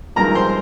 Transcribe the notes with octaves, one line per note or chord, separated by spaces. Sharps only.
G#1 G2 F3 G#3 A#4 A#5
C5 C6